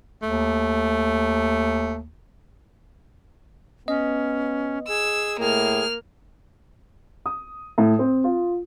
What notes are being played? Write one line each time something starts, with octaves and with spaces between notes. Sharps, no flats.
D#2 A3
B3 C#4 D#5
G#4 E6
A2 A#3 G#4 F6
D#6
A2
C4
F4